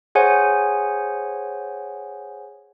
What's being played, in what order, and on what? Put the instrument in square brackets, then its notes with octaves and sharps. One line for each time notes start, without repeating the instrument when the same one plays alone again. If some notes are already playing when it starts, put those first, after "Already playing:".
[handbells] G#4 C5 C#5 F#5 G#5